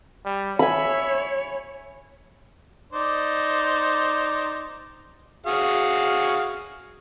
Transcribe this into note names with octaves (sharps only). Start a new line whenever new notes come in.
G3
C#5 E5 G#5 B5
D#4 C5 D5
F#4 G#4 F5